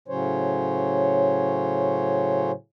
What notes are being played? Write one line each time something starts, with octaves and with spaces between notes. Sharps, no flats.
A2 C#3 F#3 C#4 C5 C#5